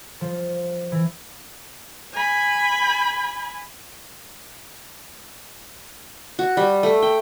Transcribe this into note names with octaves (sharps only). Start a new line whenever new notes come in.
F3
E3
G#5 B5
F#4
G3
A3
G5